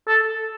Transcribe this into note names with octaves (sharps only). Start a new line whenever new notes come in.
A4